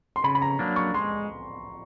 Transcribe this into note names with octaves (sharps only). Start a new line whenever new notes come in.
C6
C#3 B5
B5
A#5
F#3 A#3 D4
C#6
G#3 C6